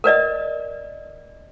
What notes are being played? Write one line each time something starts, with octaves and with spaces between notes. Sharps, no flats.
A#4 B4 D5 D#5